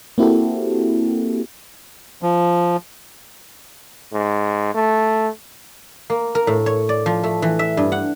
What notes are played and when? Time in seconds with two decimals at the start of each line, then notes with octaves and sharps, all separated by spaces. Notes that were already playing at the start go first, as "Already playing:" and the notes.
0.18 A#3 C4 E4 F#4 G4 A4
2.22 F3
4.13 G#2
4.74 A3
6.10 A#3
6.35 A#4
6.47 A2
6.66 C#5
6.89 D5
7.06 F3
7.24 A3
7.42 E3
7.59 E5
7.77 G2
7.92 F#5